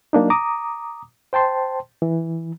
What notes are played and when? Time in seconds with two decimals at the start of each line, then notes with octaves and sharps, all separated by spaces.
0.13 F#3 A#3 D4 D#4
0.30 A#5 D6 D#6
1.33 C5 G5 A5 C6
2.02 E3